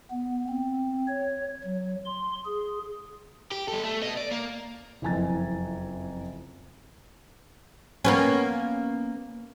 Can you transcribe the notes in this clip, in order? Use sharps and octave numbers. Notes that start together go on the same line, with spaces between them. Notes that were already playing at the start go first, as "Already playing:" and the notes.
B3
C4
C#5
F#3
C6
G#4
G4
G3 A4
A3
B3 D#5
D5
A#3
F#1 F2 E4 G#5 A#5 A6
A#3 B3 C#4